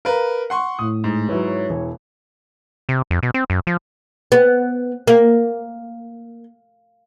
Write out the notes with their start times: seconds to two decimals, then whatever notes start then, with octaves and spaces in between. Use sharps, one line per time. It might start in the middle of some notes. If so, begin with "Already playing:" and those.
0.05 A#4 B4 F5 A#5
0.50 F#5 C6 C#6
0.79 A2 D#6
1.04 G#2
1.29 F#3 E4 B4 C#5
1.69 E1 E3
2.89 C3
3.11 F2
3.23 B2
3.34 C4
3.50 F#2
3.67 F3
4.32 B3
5.07 A#3